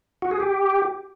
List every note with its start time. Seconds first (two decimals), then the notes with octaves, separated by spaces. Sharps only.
0.22 F#4
0.31 G#4
0.40 G4